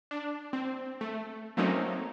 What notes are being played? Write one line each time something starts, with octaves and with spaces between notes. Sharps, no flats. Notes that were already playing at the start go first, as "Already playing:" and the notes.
D4
C4
A3
F#3 A3 A#3 C4 C#4 D#4